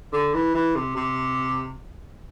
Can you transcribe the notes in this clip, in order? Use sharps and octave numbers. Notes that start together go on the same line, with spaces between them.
D3
E3
E3
C3
C3